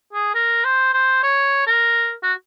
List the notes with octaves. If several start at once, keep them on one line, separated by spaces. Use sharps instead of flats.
G#4
A#4
C5
C5
C#5
A#4
F#4